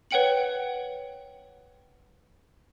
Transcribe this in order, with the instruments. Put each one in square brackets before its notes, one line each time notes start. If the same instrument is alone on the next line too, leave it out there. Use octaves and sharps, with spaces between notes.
[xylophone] B4 C#5 F#5 G5 C#7 F#7